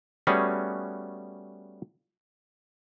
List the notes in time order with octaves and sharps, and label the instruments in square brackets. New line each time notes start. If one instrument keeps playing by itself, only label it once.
[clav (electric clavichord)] G3 A3 B3 C#4 F#4 G#4